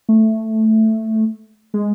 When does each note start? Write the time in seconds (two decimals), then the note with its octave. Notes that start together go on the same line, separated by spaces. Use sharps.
0.09 A3
1.74 G#3